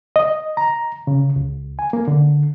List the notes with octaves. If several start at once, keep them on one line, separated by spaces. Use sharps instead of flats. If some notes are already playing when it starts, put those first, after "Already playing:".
D#5
A#5
C#3
C#2
G#5
A#3
D3